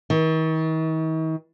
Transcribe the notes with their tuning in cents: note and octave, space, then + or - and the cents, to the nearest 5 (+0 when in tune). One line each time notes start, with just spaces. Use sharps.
D#3 +45